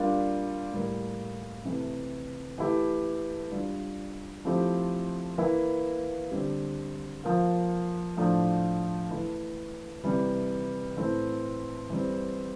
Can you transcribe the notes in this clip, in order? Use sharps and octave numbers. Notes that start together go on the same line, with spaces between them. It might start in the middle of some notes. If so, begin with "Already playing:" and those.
Already playing: G3 A#3 D4 F4
A2 G3 A#3
C3 E3 A3
E3 A3 E4 G4
G3 D4 F4
F3 A3 C4 E4 G4
E3 A#3 E4
D3 G3 C4 G4
F3 A#3 F4
A2 F3 A3 D4 F4
E3 A3 E4
C3 E3 G3
A2 E3 A3 C4 E4
E3 G3 C4